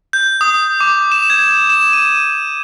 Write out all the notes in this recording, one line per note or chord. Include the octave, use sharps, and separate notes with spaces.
G6
D#6
D6
E7
G#6
E7
D#7